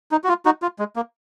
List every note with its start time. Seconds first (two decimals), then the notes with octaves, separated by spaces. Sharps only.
0.12 D#4
0.24 F#4
0.29 F4
0.45 D#4 F#4
0.62 F4
0.79 G#3
0.96 A#3